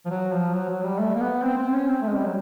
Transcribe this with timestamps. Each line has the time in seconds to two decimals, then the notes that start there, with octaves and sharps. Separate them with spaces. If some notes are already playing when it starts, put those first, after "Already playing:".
0.05 F3
0.10 F#3
0.33 F3
0.55 F#3
0.69 F#3
0.84 G3
0.99 A3
1.15 A#3
1.21 B3
1.44 C4
1.58 C4
1.73 C#4
1.88 C4
2.02 A3
2.08 G#3
2.17 G3
2.25 F#3